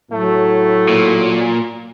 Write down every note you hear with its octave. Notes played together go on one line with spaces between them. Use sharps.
A2 F#3 A3
A#2